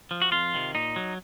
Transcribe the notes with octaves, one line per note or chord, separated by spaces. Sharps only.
F3
F#4
F2 F4
C3 D#3
A#2 D#4
F#3